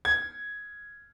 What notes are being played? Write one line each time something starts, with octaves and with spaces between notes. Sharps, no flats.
G#6